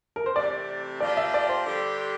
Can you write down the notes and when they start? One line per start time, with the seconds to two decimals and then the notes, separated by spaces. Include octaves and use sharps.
0.16 A#4
0.26 C5
0.36 C3 E3 A3 D5
1.00 F3 A#3 D4 G4 D5
1.17 E5
1.34 D5
1.49 C5
1.66 D3 G3 D4 G4